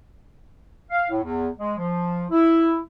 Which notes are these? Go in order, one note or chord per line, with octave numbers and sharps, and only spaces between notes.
F5
A2
E2
G#3
F3
E4